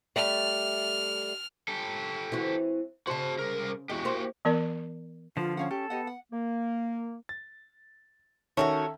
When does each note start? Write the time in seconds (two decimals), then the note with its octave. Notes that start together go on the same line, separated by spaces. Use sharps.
0.16 G3 A3 F6
1.68 G4 A4
2.32 E3 C4 F#4
3.07 C#3 F#4 C5 A5
3.39 C2 A#4
3.90 E2 G#3 F#4 G4
4.05 A#3 C5
4.45 E3 B3 A#4 D5
5.37 D3 F3 F4 B4
5.57 C#4 C#5 F5 F#5
5.71 G4 A4
5.90 B3 G4 D#5 F#5
6.07 F#5
6.32 A#3
7.29 A6
8.57 D#3 C#4 F#4 G#4 A4 C#5 E5